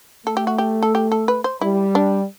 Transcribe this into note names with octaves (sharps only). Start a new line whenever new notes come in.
A3 A4
G4
F#4
G4
A4
G4
A4
B4
C5
G3 E4
D4